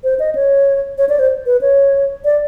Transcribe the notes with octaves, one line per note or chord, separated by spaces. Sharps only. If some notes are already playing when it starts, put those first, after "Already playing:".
C5
D#5
C#5
C#5
D5
C5
B4
C#5
D5